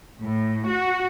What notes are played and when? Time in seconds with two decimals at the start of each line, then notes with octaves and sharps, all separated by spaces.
0.20 A2
0.68 F#4